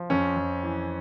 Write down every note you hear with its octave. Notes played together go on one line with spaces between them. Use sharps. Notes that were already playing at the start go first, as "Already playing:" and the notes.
Already playing: F3
F2 C#4
F2
E3